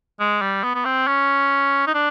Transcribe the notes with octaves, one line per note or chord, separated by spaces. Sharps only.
G#3
G3
B3
B3
C4
C#4
D#4
D4